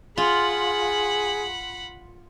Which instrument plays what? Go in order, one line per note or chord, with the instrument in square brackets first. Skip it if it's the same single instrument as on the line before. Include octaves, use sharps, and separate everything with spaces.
[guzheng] F4 [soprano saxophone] G#4 [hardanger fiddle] F#5 B5